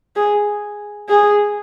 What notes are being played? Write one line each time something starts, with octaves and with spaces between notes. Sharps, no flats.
G#4
G#4